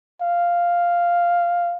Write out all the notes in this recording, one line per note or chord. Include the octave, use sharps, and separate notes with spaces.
F5